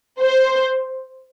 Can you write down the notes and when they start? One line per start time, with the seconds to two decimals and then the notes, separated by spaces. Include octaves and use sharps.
0.22 C5